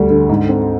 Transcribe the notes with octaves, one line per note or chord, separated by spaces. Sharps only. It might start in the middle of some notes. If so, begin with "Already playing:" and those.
Already playing: D2 G3
D3
G#2
C4